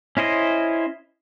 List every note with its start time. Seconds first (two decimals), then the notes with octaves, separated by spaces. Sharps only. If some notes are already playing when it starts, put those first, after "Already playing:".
0.17 C#4 E4 C5 D#5